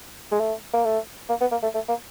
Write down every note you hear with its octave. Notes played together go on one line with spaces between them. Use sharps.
G#3
A3
A#3
A3
A#3
B3
A#3
A3
A3
A#3